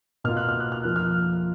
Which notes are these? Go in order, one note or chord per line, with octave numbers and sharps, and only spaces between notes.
B2 A#3 F4 F6
F#6
F6
F#6
F6
F2 F3 A#3 F4 F#6
F6